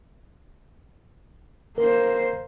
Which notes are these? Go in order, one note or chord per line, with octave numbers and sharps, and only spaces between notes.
A#3 A#4 C5